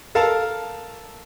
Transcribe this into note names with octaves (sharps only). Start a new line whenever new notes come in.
A4 A#4 F5 A5